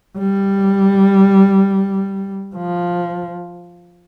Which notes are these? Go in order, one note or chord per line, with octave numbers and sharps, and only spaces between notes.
G3
F3